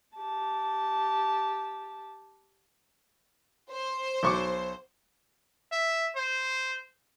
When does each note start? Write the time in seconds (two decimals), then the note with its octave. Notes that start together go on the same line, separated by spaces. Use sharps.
0.17 G4 A5
3.72 C5
4.23 B1 C#6 D6
5.72 E5
6.16 C5